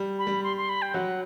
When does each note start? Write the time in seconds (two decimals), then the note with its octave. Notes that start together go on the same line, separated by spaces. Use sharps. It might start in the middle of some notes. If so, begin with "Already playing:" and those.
Already playing: G3
0.19 B5
0.27 G3
0.43 C6
0.57 C6
0.69 B5
0.82 G5
0.94 F#3 F#5